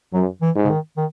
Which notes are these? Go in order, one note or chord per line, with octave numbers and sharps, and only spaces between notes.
F#2 F#3
E3
G#2
C#3
D#3
D#3